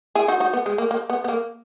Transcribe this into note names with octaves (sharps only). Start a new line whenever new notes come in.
E4 G#4
D#4 F#4
D#4 F#4
B3
G#3
A#3
A#3
B3
B3
A#3